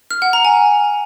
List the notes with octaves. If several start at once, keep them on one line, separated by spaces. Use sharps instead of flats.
F6
F#5
A#5
G#5